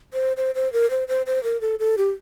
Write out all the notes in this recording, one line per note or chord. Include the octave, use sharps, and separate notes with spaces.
C5
C5
C5
A#4
C5
C5
C5
A#4
A4
A4
G4